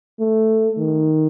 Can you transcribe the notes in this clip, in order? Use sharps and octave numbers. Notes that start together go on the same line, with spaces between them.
A3
D#3